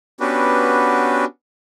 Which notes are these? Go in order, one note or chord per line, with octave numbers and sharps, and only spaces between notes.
B3 C#4 D4 F#4 G4 B4